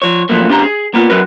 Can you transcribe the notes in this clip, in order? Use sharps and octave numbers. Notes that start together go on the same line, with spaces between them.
F3 C#5
A#2 F3 F#3 A3 A#3
C#2 D4 G4 A#5
G#4
A#3 B3 F4
F#3 E4 F#4 A#4 B4